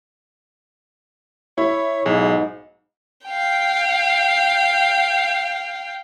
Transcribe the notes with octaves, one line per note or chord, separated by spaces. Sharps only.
E4 C#5
B1 G#2 D#4 G#4
F5 G5